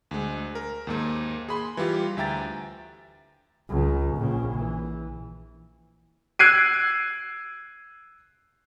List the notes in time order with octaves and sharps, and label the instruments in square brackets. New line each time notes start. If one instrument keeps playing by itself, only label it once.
[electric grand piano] D2 G#3
A#4
D#2 G#2 A#3
G#4 B5 C6
E3 G3 F4 G4
D2 E5 G5 A#5 A6
[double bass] C#2
A#1 C#3
E3
[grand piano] E6 F#6 G#6 C7 D7 D#7